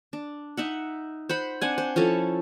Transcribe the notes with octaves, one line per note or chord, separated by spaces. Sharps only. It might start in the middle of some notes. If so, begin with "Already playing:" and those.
D4
D#4 E5 F#5
C5 F#5 B5
C4 D4 F#5 G#5
C5
F3 C#4 E4 A4